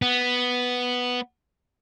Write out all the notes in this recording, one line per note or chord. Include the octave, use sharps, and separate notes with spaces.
B3